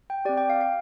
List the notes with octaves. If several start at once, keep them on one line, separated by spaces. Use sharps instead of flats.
G5
C4 G4 D5
G5
F5
F5